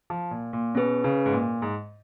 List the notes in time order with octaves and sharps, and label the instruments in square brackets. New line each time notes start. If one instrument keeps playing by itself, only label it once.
[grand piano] F3
A#2
A#2
[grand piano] B2 [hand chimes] C#4 G#4 B4
[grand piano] C#3
G#2
A#2
G#2